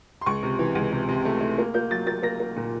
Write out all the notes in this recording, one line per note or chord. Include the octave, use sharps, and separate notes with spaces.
C6
C#2 C#6
C3
E3
C#2
C3
C3
A3
A3
A#3
A#3 G6
F#3 A6
A#3 A6
A#3 A#6
A#3
A#2